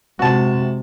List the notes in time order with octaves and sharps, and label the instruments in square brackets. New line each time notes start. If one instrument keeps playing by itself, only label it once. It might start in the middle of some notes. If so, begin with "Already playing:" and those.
[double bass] C3 G#3 [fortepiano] F#4 A5